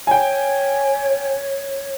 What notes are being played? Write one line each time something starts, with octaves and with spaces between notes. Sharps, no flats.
C#5 G5 G#5